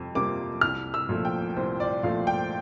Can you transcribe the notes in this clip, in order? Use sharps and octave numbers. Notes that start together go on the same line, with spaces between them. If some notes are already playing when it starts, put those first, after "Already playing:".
Already playing: F2 C3 F4
C3 G3 A#3 F4 D6
C2 F6
E6
A#2 F3 A3
G5
C2 C5
D5
A#2 F3 A3 F5
G5